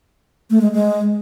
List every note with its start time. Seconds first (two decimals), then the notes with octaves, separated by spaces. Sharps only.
0.50 A3
0.61 G#3
0.72 G#3